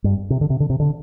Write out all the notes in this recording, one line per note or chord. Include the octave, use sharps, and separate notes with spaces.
G2
C3
D3
C3
D3
C3
D3